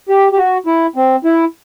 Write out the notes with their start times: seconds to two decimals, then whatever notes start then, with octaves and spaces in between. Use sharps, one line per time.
0.09 G4
0.32 G4
0.37 F#4
0.66 E4
0.96 C4
1.25 E4